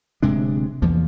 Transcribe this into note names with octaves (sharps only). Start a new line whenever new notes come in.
D1 C3 G#3 D4
E2 E3 F3 A#3